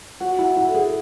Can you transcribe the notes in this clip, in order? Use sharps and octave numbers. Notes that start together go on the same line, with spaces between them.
F#4 F#5
E4
F#5
E4
A4
G#4